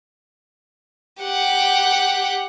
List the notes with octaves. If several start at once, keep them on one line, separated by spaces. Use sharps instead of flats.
G4 F#5